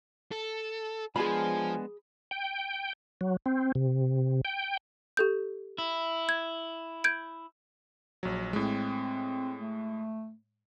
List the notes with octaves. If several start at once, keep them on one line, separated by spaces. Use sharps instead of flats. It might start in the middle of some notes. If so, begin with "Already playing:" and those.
A4
F3 G#3 B3 D4 G#4 G#5 B5
G5
F#3
C4
C3
G5
G4 A4 G6
E4
G#6
G6 G#6 D7
A#1 F#3
A2 G#3 C4
A3